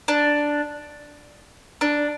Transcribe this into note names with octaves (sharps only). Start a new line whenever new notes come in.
D4
D4